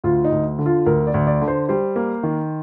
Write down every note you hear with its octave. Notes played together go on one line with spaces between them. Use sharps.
D2 F4
D#4
D2
D3
F4
D2 A#4
D5
D2
D5
D3
C5
G3 C5
A#3
D#3